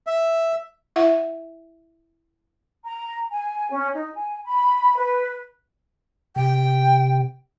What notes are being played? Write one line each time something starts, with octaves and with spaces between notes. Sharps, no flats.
E5
E4 E5 F#5
A#5
G#5
C#4
D#4
G#5
B5
B4
C3 G5